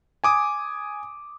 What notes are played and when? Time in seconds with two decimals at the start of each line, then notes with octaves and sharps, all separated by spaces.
0.24 G#5 D6 D#6